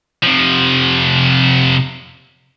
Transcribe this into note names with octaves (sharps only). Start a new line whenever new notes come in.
C3 F3